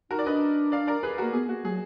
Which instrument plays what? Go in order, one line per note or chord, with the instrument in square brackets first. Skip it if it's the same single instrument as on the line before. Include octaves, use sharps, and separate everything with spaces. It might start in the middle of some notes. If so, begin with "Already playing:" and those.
[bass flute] D#4 [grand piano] F#4 A#4
[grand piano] D5
[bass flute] D4 [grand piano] B4 D#5
[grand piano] D5 F5
A#4 D5
G#4 B4
[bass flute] A#3 [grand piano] F#4 A#4
[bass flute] B3 [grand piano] G#4
[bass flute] A#3 [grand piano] F#4
[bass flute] F#3 [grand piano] G#4